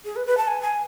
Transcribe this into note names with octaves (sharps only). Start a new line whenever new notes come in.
G#4
B4
B4
A5
G#5
G#5